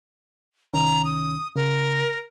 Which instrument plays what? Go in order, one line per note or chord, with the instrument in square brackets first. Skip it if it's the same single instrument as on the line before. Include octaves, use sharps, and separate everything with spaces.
[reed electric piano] C2 D#3 C#4 [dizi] A#5
[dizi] D#6
[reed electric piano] C#3 [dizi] A#4